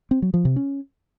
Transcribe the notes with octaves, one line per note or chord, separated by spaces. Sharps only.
C4
F#3
F3
C3
C#4